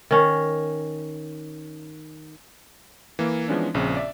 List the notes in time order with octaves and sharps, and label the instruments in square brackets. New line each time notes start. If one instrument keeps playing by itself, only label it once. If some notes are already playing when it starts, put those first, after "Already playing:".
[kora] D#3 C#4
[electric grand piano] E3 A#3
E3 F3 G#3 B3 C#4 D4
A#1 C#3 C4
D5 E5